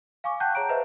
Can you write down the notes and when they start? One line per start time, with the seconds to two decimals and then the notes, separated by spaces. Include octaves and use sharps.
0.24 F5 G#5 C#6 D6
0.40 F#5 G5 A5 F#6 G6
0.55 G#4 C#5 A#5 D7
0.69 B4 C5 D#5 E5